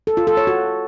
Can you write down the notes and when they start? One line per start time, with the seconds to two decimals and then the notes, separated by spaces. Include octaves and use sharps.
0.07 A4
0.17 F4
0.27 A4
0.37 C#5
0.47 F#4